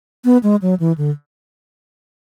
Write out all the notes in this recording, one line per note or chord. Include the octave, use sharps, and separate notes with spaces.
B3
G#3
F#3
E3
D3